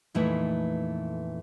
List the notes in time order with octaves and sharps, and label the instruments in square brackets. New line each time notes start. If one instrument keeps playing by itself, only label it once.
[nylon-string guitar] F2 A#2 E3 A3 D#4 B4